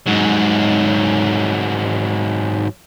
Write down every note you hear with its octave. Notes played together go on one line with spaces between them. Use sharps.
G#2 F#3